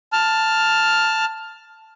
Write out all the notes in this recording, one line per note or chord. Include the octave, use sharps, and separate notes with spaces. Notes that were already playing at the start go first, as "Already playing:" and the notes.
A5 F6